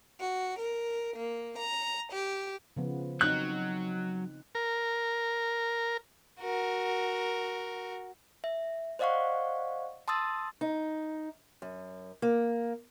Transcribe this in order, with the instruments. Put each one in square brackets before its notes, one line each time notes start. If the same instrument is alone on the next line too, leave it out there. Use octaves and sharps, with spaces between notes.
[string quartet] F#4
A#4
A#3
A#5
G4
[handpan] C#3 F3 B3
[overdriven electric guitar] F#3 [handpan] C4 D#4 [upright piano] F#6
[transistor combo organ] A#4
[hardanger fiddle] F#4 A#4
[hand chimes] E5
C5 D5 D#5 F5 F#5 C#6
A5 C6 D#6 E6 A6
[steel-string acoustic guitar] D#4
F#2
A#3